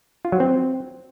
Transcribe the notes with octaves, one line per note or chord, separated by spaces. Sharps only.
F4
F#3
C4